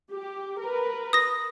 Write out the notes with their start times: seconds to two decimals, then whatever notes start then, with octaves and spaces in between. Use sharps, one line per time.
0.12 G4
0.61 A#4 B4
1.13 D#6 A#6